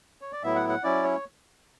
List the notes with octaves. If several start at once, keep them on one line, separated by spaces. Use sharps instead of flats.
C#5
D5
A2 F#3 B3 E4 E5
F#5
F#5
F#3 C#4 E4 D5
C#5